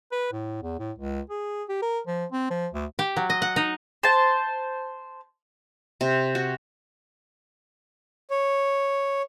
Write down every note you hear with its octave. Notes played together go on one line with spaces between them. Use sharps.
B4
A2
E2
A2
C#2
G#4
G4
A#4
F3
C4
F3
D2
G4
F#3
D#5
F#5
D#4
C5 A5
C3
F#4
C#5